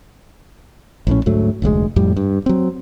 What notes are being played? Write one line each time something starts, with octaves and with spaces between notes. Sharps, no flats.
A#1 A2 C#4
D2 G#2 F#3 A3
F1 D2 B2 G#3
F2 A2 G3
G2
F#3 C4